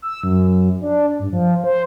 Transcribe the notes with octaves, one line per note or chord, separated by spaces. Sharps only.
E6
F#2
D4
G2
F3
C5